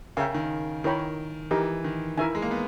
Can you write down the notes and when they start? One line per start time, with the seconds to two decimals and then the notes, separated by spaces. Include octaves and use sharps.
0.17 C#3 A#4 E5 G5
0.34 D#3
0.84 D#3 E4 A#4 C#5 G5 B5
1.51 E3 D#4 G4 A#4
1.84 D#3
2.17 D#3 E4 A#4 E5 G#5
2.35 G#3
2.42 A#3
2.51 B3